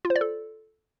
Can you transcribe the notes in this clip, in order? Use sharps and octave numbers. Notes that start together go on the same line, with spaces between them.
F4
C5
D5
A4